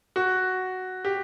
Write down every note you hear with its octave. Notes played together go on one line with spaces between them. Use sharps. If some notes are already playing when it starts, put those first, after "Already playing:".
F#4
G4